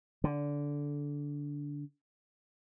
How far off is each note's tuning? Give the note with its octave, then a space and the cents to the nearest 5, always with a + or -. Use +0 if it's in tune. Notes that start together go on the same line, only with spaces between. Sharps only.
D3 -15